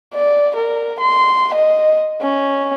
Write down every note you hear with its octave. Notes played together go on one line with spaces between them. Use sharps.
D5
A#4
C6
D#5
C#4